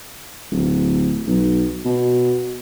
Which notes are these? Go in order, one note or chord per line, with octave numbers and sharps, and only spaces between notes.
D1
B1
B2